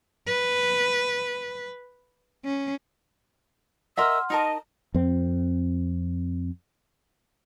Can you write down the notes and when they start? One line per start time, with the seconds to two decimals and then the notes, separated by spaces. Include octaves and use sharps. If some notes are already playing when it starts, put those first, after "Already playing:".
0.27 B4
2.45 C#4
3.97 A#4 D#5 E5 F#5 C6 E6 F6
4.30 D#4 A#4 D#5 A5
4.94 F2 C4